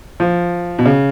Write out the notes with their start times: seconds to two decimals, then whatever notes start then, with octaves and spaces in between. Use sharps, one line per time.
0.20 F3
0.79 B2
0.86 C#3